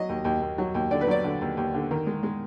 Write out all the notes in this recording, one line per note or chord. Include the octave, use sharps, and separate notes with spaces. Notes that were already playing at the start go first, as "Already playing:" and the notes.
Already playing: F#3 D#5
D#2
D#2
D#2
F#3
D#2
D3 D5
B4
F#3 D5
D3
D#2
D#2
D3
D#3
G#3
G#3